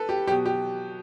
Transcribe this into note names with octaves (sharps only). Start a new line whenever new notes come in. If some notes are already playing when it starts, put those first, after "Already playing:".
Already playing: A4 B4
G4
B2 F#3 G4
G4